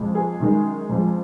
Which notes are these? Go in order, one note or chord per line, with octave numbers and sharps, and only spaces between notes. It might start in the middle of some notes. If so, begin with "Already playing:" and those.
Already playing: F2 F3 G#3
G#4
F#2 D#3 G#3
F2 F3 G#3